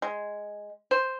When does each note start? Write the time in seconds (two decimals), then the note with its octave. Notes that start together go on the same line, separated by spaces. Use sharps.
0.02 G#3
0.91 C5